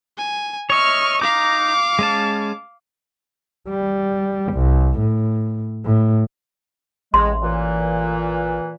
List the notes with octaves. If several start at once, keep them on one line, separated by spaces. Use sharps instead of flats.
G#5
C#5 D#5 E5 C#6 F6
D#4 F5 A#5 D6
G#3 C#4 A5
G3
C2
A2
A2
A1 G#3 C6
A#2 E3